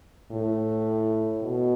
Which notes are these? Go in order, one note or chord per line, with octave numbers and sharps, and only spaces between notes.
A2
B2